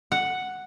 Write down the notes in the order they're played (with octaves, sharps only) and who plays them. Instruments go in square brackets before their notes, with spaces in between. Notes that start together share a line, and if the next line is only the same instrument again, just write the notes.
[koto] F#5